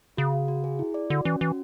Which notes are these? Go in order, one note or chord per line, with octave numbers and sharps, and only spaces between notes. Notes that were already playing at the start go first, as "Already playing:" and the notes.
C#3 F#4
F#4
F#4
G#4
E4
D5
D3 F#4
E3 C#4
E3 F#4